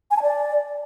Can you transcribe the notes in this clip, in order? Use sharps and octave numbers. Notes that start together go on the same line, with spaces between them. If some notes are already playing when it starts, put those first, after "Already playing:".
G#5
A5
D5